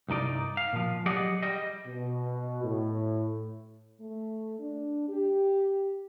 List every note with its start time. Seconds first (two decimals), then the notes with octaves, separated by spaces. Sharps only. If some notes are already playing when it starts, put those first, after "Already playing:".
0.08 C2 G2 D#4 D5
0.57 F5
0.73 A#2 F3
1.06 F#3 G4 G#4 D5 D#5 F#5
1.43 G3 D#5
1.87 B2
2.63 A2
4.00 A3
4.59 D4
5.09 G4